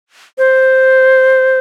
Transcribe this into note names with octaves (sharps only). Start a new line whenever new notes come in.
C5